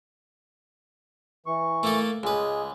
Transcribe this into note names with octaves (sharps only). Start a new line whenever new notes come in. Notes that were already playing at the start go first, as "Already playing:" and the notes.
E3 C#6
A3 A#3 A4
C#2 G#3 G#4 B4